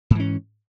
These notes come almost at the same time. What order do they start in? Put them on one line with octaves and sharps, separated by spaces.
G#2 E3 C#4